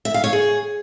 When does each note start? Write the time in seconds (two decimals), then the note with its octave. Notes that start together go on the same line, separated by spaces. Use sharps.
0.05 E5
0.14 F5
0.24 C#5
0.33 G#4